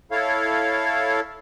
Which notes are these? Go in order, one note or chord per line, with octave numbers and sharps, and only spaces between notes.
E4 A4 C#5 F5